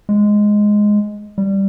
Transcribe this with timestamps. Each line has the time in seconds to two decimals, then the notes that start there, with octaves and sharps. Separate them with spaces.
0.09 G#3
1.38 G3